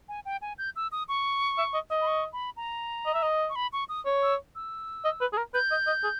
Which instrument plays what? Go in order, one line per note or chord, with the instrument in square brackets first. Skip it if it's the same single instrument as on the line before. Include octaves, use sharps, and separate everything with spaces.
[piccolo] G#5
G5
G#5
G6
E6
D#6
C#6
[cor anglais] E5
D#5
D#5
[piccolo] B5
C#6
B5
A#5
[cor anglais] D#5
E5
D#5
[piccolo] C#6
B5
C#6
D#6
[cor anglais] C#5
[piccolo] E6
E6
[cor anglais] D#5
B4
G#4
A#4
[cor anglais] B4 [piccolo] G6
[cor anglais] D#5
D#5
G#4